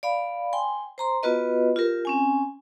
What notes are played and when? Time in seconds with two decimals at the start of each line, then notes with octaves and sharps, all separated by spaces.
0.03 D5 F5 B5
0.53 G5 G#5 C6
0.98 C5 A#5 C6
1.23 B3 F4 F#4 B4 D#5
1.76 F4 G4 A#4
2.05 C4 C#4 G#5